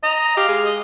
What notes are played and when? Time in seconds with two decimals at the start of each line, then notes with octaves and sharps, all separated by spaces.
0.03 D#5 A#5
0.37 G4 F5
0.48 G#3
0.65 D#5